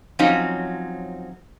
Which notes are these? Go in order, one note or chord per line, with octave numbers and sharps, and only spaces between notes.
F3 F#3 C4 C#4 D#4